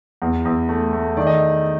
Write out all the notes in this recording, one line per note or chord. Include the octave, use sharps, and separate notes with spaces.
E2
E2
A3
A3
D#3 D5
D#5